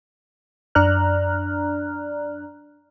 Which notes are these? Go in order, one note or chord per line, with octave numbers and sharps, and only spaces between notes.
F#2 D4 D5 A#5 F6 F#6